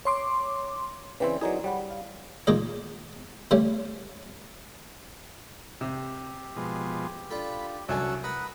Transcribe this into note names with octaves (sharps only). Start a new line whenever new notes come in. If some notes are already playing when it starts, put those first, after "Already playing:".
C#5 C6 D6
C#3 E3 C4 B4 D5 G5
F#3 D#4 E4 G#4 A#4 D5
G3 C#5 F#5 B5
F5
A#2 D#3 G#3 D#5
D3 G3 A3 C#4
C3 G4
B2 F3 G#3
D4 F4 A4 B5
C2 D3 F#3 C#4 F#5 G#5 A5 E6
A#4 B4 F#5 B5 D#6